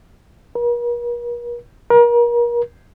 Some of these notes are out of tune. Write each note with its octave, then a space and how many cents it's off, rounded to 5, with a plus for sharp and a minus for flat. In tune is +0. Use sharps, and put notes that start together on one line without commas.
A#4 +45
A#4 +35